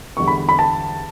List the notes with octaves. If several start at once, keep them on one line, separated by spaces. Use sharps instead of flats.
E2 D3 G3 C#6
B5
B5
A5